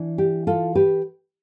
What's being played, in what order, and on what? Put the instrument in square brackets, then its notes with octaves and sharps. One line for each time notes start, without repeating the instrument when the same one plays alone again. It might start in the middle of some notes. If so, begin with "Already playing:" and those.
Already playing: [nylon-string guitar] E3 D4
G4
F4 A4
G4 B4